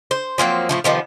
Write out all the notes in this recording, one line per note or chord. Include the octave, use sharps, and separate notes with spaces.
C5
F3 F#3 A#3 C4
A2 F3 A3
C3 D#3 F3 B3